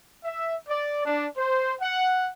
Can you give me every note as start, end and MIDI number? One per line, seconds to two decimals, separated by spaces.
0.24 0.55 76
0.68 1.05 74
1.05 1.27 62
1.37 1.74 72
1.81 2.30 78